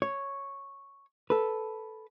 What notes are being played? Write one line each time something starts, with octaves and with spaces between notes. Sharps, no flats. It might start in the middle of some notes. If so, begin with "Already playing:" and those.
C#5
A4 B4